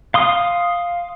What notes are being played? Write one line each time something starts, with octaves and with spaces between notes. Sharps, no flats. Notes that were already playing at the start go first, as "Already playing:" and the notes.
F5 C6 D#6